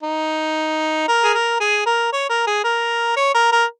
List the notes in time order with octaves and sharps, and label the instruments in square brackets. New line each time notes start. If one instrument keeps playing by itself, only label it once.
[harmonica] D#4
A#4
G#4
A#4
G#4
A#4
C#5
A#4
G#4
A#4
C#5
A#4
A#4